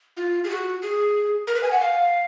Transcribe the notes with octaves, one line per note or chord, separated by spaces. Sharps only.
F4
G#4
F#4
G#4
A#4
B4
G#5
F#5
F5